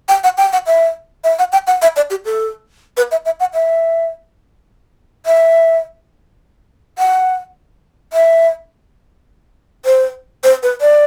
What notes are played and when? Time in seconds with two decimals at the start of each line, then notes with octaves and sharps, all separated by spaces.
0.09 G5
0.24 F#5
0.38 G5
0.53 F#5
0.67 E5
1.24 E5
1.39 F#5
1.52 G5
1.67 F#5
1.82 E5
1.96 D5
2.10 G4
2.25 A4
2.97 B4
3.11 E5
3.26 E5
3.40 F#5
3.54 E5
5.26 E5
6.99 F#5
8.13 E5
9.85 C5
10.44 C5
10.63 B4
10.81 D5